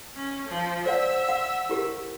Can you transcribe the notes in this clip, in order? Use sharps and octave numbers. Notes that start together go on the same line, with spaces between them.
C#4
F3
C5 D5 E5 F#5
F#5
E4 G4 A#4